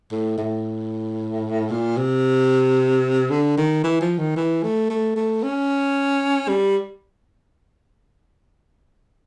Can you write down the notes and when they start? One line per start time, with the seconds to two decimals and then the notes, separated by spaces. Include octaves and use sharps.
0.12 A2
0.38 A2
1.71 A#2
1.97 C3
3.30 D3
3.57 D#3
3.84 E3
4.01 F3
4.19 D#3
4.36 E3
4.63 A3
4.90 A3
5.16 A3
5.43 C#4
6.49 G3